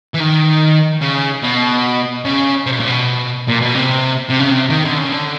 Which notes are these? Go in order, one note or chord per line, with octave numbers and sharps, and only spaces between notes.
E3
D#3
C#3
B2
C#3
C3
B2
A#2
B2
A#2
B2
C3
C3
C#3
C3
D#3
D3
C#3
D3